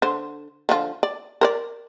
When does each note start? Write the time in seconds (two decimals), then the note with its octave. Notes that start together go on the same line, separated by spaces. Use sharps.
0.02 D3 C5
0.69 D3 F3 F4
1.03 D5
1.41 A#4 C5 D5